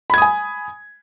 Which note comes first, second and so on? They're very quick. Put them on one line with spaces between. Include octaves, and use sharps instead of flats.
B5 G#6 D#6 G#5